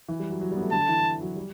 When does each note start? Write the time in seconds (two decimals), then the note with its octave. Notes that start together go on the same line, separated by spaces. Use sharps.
0.09 E3
0.20 G3
0.30 F#3
0.41 F#3
0.51 G3 B3
0.62 A3
0.72 D3 A5
0.89 E3
1.21 F#3
1.36 G3